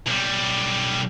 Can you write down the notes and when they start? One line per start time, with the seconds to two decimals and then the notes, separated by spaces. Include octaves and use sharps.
0.06 B1 G3